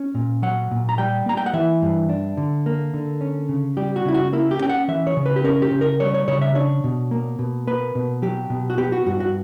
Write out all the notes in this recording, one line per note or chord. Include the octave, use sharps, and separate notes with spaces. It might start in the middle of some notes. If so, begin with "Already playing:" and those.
Already playing: C#4
A#2
F#3 F#5
A#2
A#5
G3 G5
A#3 A#5
G5
F#5
E3 E5
G2
D4
D3
A#3
D3
C#4
C#3
G3 G4
F#4
C#3 E4
F#4
A#3 E4
G4
C#4 G5
F#5
E3 E5
C#5
C#3
B4
G4
C#4 A#4
G4
C#3
A#4
G3 C#5
C#5
C#3 C#5
E5
D4 C#5
B2
A#3
B2
A#3 B4
B2
F#3 G4
B2
F#4
B3 G4
F#4
G2 F#4
F#4